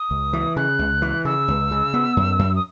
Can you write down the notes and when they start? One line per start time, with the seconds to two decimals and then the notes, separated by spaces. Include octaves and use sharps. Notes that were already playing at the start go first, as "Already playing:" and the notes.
Already playing: D#6
0.11 C#2
0.33 E3
0.56 C#3 F#6
0.79 C#2
1.02 E3
1.25 C#3 E6
1.48 C#2
1.71 C#3
1.94 B3
2.17 F#2
2.39 F#2
2.56 D#6